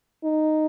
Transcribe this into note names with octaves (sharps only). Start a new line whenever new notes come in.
D#4